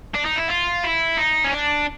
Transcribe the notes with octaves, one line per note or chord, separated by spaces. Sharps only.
D4
D#4
E4
F4
E4
D#4
C#4
D4